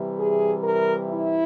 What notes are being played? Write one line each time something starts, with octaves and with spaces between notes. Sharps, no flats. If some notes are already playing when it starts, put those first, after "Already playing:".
Already playing: C3 E3 G3
G#4
A#4
E4